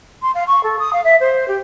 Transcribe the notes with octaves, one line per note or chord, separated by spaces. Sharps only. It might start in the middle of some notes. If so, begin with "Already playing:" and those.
C6
F5
C#6
A4
D#6
F5
E5
C5
G4